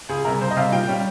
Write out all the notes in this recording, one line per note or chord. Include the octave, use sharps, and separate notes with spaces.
C#2 G#4
C3 G3 A#4
C#2 C5
D#5
C3 G3 F5
A#2 G5
G3 C#4